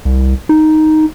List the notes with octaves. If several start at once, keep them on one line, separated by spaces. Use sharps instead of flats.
C2
D#4